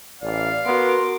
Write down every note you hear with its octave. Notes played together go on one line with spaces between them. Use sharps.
A1 D5 F5
B3 F#4 A#4 C6 D6